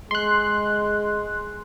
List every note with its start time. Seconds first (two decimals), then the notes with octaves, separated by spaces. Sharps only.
0.11 G#3 C6 F#6